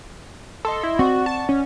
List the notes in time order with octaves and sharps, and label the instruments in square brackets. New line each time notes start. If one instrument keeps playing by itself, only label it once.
[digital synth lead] A4 [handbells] D#5 C6 E6
[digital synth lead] E4
[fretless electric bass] C4 [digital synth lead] F#4 [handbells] D5 F#5 C#6
[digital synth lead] A5
C#4